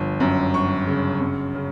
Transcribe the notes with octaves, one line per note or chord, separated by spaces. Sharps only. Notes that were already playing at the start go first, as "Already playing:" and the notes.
Already playing: G1 F3
F#2
G1 C#6
C#3
F#2
C#3